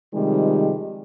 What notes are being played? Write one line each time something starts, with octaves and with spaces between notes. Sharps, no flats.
C3 D#3 F3 G3 G#3